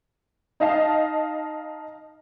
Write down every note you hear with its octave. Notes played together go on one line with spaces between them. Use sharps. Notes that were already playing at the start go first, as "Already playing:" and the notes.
D#4 D#5 F5 A5